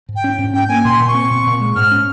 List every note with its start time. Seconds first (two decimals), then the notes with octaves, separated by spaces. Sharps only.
0.09 G#2
0.16 G5
0.24 C#4
0.38 G#2
0.54 C#4 G5
0.69 A#3 G#5
0.84 A#2 C6
1.00 A#2
1.08 C#6
1.14 C4
1.30 A#2
1.46 A#2
1.61 G#3
1.76 G#2 F6
1.91 C#4